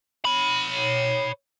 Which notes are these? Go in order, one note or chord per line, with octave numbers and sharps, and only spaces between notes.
C#5 B5